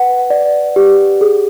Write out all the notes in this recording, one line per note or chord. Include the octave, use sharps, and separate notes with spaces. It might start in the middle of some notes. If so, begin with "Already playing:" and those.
Already playing: B4 F#5
D5
G4
G#4